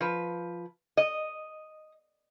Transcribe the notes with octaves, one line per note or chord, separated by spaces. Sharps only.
F3 B4
D#5